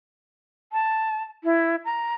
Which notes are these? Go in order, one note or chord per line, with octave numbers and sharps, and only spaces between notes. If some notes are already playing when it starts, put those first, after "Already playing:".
A5
E4
A#5